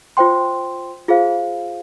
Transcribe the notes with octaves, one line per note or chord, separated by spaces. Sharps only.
F4 C5 G5 C6
F4 G#4 C5 F5